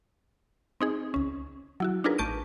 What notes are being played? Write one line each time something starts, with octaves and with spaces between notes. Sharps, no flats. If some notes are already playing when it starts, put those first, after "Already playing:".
C4 D#4 G#4
C#2 C#4
F#3 E4 F#4
D4 D#4 F4 G#4 A#4 B4
A1 A5 C#6 G6 D7 D#7